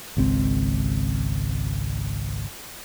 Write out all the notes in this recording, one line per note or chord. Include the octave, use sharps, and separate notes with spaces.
G#1 C#2 C4